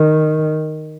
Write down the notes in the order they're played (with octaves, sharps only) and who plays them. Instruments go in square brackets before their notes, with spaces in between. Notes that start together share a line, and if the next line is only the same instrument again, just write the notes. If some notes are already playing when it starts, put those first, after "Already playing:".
Already playing: [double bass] D#3